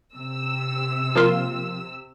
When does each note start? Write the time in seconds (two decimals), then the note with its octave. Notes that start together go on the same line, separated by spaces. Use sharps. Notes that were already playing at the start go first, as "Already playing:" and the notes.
0.16 C3 E6
1.15 F3 A#3 F4